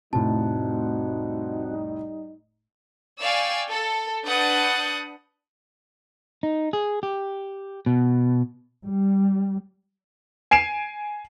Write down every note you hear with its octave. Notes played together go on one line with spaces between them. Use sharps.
F1 A2 G3 C4 D#4 F#4 A5
D5 F5 G5 G#5 C#6 E6
A4
D4 B4 F#5 D#6 G6 A6
D#4
G#4
G4
B2
G3
G#5 C7 D7 E7